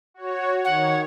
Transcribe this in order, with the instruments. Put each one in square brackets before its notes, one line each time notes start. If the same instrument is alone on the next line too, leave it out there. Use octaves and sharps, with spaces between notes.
[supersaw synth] F#4 C#5
[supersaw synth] D#3 C#5 [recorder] F#5